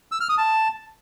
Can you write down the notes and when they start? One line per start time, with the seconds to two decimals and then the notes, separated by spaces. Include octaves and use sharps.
0.12 E6
0.20 F6
0.29 D#6
0.38 A5